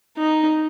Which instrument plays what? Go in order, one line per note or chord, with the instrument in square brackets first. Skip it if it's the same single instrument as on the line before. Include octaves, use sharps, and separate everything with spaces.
[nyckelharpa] D#4